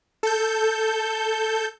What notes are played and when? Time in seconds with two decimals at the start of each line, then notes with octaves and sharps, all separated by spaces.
0.23 A4 G6